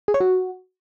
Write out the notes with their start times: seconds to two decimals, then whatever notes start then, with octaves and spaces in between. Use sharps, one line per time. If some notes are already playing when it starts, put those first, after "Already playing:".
0.08 G#4
0.14 C#5
0.20 F#4